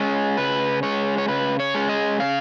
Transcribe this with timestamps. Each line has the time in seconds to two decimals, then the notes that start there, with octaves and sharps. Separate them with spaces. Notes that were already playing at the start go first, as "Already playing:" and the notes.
Already playing: G#3 C#4 D#5
0.37 C#3 B4
0.83 G#3 C#4 C#5
1.18 C#5
1.28 C#3 B4
1.60 C#5
1.74 G#3 C#4
1.89 D#5
2.19 C#3 F5